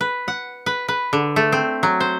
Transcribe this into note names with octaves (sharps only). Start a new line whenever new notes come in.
B4
F#5
B4
B4
D3
A3
C4
F#3
C5